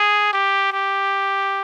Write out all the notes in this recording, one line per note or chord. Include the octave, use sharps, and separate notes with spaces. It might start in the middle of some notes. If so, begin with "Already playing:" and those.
Already playing: G#4
G4
G4